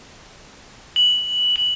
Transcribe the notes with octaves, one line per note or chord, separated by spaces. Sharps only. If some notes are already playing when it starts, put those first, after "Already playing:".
F#7
F#7